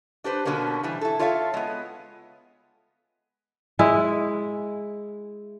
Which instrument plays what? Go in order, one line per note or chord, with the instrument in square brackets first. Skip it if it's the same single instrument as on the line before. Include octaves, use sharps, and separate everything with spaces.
[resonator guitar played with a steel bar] D4 G4 B4 C5
B2 D3 F#3 A#3 C#4
E3 G3
E4 A4
F4 A4 C#5 E5 F5
G#3 B3
[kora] G#3 E4